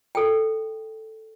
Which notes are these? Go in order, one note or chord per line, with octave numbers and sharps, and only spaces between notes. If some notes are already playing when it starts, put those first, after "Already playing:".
A4 G5